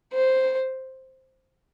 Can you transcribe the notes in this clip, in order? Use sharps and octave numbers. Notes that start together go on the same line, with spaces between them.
C5